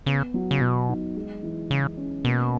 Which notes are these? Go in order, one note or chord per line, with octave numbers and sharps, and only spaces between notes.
C#3 B3
F#3
C#3
B2 F#3
D#4
G#3
E3
C#3 E3
C#4
B2 A#3